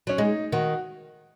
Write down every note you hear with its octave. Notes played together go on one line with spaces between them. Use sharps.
F#3 C#4
G#3 D#4
D#3 F#4